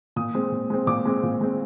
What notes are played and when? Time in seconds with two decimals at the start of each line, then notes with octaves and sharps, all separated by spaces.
0.16 A#2 D#6
0.35 G#3 C4
0.51 A#2
0.70 G#3 C4
0.87 A#2 D6
1.05 G#3 C4
1.23 A#2
1.41 G#3 C4